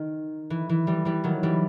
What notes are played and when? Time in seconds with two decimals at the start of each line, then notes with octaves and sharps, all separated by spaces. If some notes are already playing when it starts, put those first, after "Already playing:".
Already playing: D#3
0.50 E3
0.69 E3
0.87 E3 G3
1.05 E3 G3
1.24 D#3 F#3
1.43 E3 G3